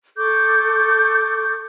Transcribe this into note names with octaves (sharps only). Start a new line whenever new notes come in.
A4 C#6 D6 G6